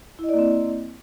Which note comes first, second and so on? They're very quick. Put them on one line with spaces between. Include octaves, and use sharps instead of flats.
E4 D#5 D5 A#3 C4